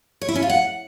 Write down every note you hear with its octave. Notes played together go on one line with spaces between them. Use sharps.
C#5
E4
C#4
F4
F#5